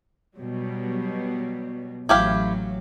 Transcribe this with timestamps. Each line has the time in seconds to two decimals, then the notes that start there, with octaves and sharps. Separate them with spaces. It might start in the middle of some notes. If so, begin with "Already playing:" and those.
0.36 B2 F#3 G3
2.09 A1 F#3 E4 G4 F5